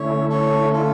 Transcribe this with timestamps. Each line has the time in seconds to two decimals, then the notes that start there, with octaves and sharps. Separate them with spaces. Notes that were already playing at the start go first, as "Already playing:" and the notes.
Already playing: D3 A3 C#4 E4 C#5
0.30 A4 C#5
0.73 F4 A4